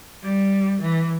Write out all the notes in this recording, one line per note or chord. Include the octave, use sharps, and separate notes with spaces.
G3
E3